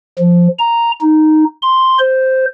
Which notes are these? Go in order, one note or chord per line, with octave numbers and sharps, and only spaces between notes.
F3
A#5
D#4
C6
C5